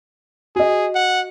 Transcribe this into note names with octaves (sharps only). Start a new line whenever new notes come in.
F#4 G#4 D#5
F#5